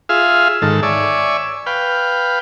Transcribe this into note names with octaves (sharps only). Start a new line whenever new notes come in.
F4 G#4 E5 F5
G#2 D#3 A4
C#5 D5 E5 G#5
B4 F5 G5